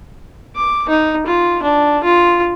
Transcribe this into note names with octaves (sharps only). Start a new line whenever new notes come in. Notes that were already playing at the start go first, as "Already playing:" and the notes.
D6
D#4
F4
D4
F4